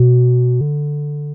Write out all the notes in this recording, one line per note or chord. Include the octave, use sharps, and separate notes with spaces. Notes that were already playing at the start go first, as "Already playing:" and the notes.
Already playing: B2
D3